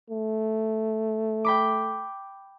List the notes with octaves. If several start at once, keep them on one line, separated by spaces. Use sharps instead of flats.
A3
G5 B5 D6